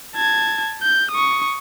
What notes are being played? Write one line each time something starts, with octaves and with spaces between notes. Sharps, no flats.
A5 G#6
G6
C#6 D#6